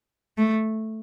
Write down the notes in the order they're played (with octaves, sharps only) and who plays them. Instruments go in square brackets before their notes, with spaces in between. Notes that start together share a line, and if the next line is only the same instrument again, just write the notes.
[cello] A3